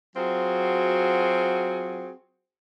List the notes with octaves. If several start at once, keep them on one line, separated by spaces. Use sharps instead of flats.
F#3 C4 F4 F#4 G#4